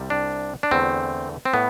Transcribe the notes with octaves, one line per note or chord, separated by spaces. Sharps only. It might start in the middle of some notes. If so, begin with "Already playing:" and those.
Already playing: C2 C3 G3
D4
D4
E2 D3 A3 C4
C4
A2 B3